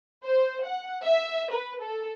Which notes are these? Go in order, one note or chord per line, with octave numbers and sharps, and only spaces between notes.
C5
F#5
E5
B4
A4